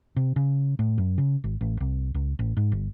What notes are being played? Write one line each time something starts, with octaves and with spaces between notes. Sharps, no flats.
C3
C#3
A2
F#2
C#3
G#1
A1
C2
C#2
A1
G#2
G1